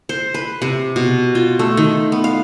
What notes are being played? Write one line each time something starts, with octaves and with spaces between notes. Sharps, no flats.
C5
B4
C3
B2
F4
A3
D#3
B3
F5